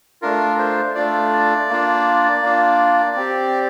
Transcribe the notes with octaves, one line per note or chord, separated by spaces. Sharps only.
A3 D4 F4 A#4
C5
A3 D4 F4 D5
A#3 D4 F4
A#3 D4 F4
C4 G4